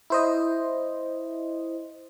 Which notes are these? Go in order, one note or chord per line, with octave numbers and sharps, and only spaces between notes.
E4 C5 D#5